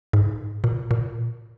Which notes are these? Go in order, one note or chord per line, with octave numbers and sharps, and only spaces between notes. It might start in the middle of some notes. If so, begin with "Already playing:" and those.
G#2
A#2
A#2